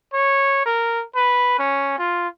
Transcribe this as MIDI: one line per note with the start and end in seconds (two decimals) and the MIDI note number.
0.13 0.65 73
0.66 1.04 70
1.15 1.57 71
1.59 1.94 61
1.98 2.28 65